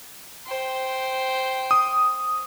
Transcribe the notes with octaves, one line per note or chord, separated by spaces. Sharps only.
C5 G5
D#6